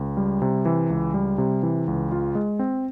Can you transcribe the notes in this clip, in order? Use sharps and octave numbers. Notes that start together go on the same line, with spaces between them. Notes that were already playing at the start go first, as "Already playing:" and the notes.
Already playing: C#2
G3
C3
E3
C#2
G3
C3
E3
C#2
F4
G#3
C4